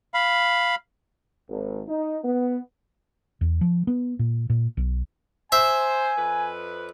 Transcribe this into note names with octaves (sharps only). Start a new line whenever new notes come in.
F5 B5
G#1
D#4
B3
E2
F3
B3
A#2
A#2
B1
C5 E5 G#5
F2 B4